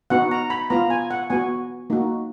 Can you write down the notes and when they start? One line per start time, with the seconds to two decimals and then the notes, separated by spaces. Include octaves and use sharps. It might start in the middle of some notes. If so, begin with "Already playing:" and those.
0.10 B3 D#4 F#4 F#5
0.31 A#5
0.50 B5
0.70 B3 F4 A#5
0.90 G#5
1.11 F#5
1.30 B3 F#4 G#5
1.90 A#3 D#4 F#4